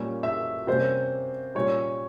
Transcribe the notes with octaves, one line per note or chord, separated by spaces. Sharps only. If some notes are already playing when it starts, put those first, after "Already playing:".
Already playing: A#2 G3 A#3 C#4
E5
C3 G3 A#3 C#4 C5
A#2 G3 C#4 C#5